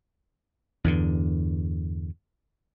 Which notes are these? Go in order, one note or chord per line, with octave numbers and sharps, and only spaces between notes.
E2 G2 D3